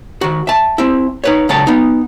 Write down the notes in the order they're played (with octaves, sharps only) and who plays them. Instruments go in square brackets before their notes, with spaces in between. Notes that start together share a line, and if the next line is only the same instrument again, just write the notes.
[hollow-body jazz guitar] D#3 F#4
E5 A5
C4 E4
D#4 B4 C#5
C#2 F#3 D4 A4 A5
B3 D#4